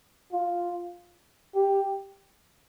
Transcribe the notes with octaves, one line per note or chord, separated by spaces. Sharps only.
F4
G4